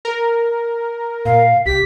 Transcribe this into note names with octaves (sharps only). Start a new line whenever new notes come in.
A#4
A#2 F5
C2 G4 B6